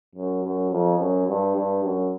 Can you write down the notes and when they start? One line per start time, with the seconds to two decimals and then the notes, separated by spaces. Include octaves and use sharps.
0.15 F#2
0.44 F#2
0.71 F2
0.99 F#2
1.27 G2
1.56 G2
1.84 F#2